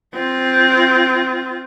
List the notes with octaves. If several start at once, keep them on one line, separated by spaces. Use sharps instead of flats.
C4 F4